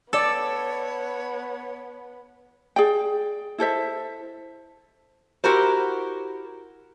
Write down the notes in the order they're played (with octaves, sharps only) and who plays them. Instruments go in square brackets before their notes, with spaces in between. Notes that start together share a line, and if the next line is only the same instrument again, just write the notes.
[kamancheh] B3 [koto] A4 [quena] C#5 [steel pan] D5 E6
[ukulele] G#4 D5 G5
E4 A4 C5 E5
[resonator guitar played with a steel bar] E4 F#4 G4 A#4 C5